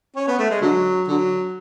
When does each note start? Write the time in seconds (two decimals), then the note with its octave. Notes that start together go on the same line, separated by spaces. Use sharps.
0.16 C#4
0.27 B3
0.39 A3
0.50 G#3
0.61 D3 F#3
1.08 D3 F#3